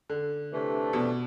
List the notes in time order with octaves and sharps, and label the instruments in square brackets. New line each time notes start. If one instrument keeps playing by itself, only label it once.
[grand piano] D3
[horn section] C3 E3 A3 D4
[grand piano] B2